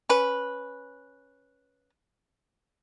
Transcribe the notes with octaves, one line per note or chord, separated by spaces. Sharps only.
C#4 B4